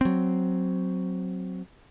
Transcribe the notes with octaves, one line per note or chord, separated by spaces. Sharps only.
F#3 C4